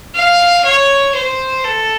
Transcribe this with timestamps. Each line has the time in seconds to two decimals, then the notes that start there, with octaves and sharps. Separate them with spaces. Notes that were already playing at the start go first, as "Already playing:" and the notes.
0.15 F5
0.65 C#5
1.15 C5
1.65 A4